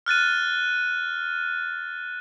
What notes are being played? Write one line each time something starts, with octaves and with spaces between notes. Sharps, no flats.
F6 F#6 A6 D#7